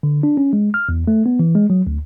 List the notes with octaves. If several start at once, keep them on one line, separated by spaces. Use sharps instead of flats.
D3
D4
C#4
G#3
F6
E2
A3
B3
E3
G#3
F#3
D2